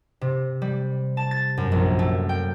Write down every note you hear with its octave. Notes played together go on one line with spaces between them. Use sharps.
C3
G3
A5
A6
F#2
A#1
A3
G5